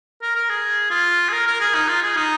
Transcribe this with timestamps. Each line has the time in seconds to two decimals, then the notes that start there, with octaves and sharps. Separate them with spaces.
0.22 A#4
0.35 A#4
0.49 G#4
0.91 F4
1.29 G#4
1.33 A#4
1.47 A#4
1.61 G#4
1.75 D#4
1.88 F4
2.02 G#4
2.17 D#4